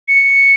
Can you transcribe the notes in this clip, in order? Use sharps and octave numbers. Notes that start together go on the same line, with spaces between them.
C#7